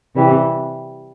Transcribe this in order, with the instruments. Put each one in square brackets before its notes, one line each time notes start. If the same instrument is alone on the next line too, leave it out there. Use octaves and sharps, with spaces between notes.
[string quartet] C3 E3 G3